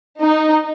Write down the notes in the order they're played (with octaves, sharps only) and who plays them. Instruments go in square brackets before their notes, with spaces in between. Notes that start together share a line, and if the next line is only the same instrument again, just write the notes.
[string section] D#4